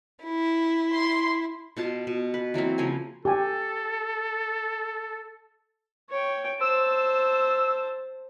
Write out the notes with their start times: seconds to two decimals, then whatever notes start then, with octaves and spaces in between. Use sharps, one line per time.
0.25 E4
0.95 C6
1.77 B2 F4 A5 C6
2.07 B2
2.34 B4
2.54 E3 F#3 A#3 C4
2.78 C#3 F3 A#3 G#5
3.25 G4 A4 G#5
6.10 C#5 G5
6.61 C5 A5 E6